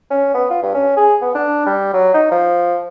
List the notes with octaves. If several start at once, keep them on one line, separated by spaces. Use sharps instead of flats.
C#4
B3
F4
G2
C#4
G#4
B3
D4
G3
F#3
D#4
F3